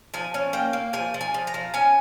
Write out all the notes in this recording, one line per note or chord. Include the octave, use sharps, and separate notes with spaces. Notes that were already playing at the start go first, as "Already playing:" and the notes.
F3 G#5
C#4
A#3 G5
A#3
F3 G#5
F3
G#5
F3
A#5
F3
C#4 G#5